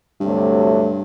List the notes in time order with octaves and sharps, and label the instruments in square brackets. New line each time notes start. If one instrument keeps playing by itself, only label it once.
[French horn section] D2 C3 F#3 A3 [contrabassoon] G2